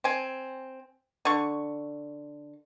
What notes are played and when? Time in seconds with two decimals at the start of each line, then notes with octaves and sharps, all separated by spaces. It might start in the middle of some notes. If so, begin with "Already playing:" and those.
0.04 C4 G#5
1.25 D3 C#6